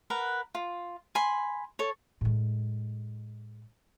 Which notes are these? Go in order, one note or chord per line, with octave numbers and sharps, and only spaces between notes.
A#4 B4 F#5
F4
G#5 B5 C6
A4 C#5
A2 G#3